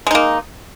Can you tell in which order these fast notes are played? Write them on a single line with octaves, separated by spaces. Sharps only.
G#3 D#4 A#3